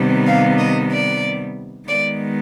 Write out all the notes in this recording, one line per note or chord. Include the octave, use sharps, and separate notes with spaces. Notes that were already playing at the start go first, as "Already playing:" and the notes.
Already playing: C3 D#3 G3 B3
F5
D#5
D5
D#3 G#3 B3 D5